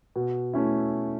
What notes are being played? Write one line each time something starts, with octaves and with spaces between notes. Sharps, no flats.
B2
A3 C#4 E4